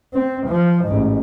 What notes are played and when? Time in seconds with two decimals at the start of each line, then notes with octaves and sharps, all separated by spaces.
0.13 C4
0.47 F3
0.85 A1 G#2